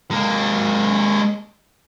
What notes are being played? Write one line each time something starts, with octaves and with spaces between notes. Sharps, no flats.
G#3 A#3